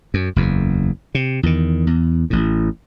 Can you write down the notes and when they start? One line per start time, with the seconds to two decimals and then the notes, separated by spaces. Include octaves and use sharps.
0.14 F#2
0.36 F#1 E2
1.15 C3
1.43 E2 D#3
1.87 E2
2.30 A1 A2